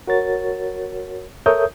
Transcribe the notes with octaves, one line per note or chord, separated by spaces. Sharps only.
F#4 A#4 C#5 A6
A4 A#4 C#5 E5 D#6 G6